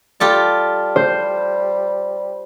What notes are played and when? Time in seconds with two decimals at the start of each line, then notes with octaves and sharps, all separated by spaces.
0.20 G3 F4 G4 A4
0.96 C5